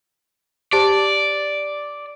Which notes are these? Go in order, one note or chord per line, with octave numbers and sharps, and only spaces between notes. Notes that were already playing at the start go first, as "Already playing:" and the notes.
G4 C5 D5 A5